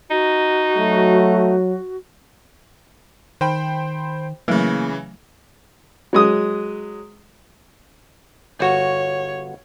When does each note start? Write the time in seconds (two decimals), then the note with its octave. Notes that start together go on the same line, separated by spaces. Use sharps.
0.10 D#4 F#4
0.77 F#3 A3
3.41 D#3 C5 G5 B5
4.48 C#3 E3 F#3 A3 A#3
6.13 F#3 G#3 D#6
8.60 G1 F#4 C#5